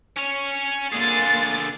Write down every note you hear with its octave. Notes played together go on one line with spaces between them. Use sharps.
C#4 C#5
D3 A#3 F4 G#4 A6